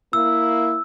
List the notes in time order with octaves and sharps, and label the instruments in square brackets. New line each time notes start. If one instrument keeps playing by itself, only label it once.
[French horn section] A#3 E4 [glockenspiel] E6